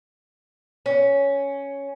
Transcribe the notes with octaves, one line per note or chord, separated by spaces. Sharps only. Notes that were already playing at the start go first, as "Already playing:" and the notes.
C#4